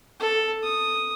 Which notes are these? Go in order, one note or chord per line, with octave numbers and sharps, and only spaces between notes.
A4
D#6